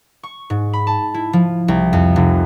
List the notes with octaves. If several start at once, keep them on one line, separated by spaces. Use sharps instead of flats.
C#6
G#2
B5
A5
E4
F3
C2
F2
F1